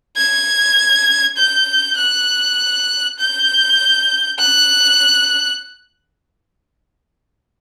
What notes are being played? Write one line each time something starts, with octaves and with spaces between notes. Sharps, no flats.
G#6
G6
F#6
G6
F#6